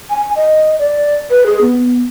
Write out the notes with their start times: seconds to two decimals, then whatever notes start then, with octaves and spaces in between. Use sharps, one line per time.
0.10 G#5
0.36 D#5
0.79 D5
1.31 B4
1.46 G#4
1.61 B3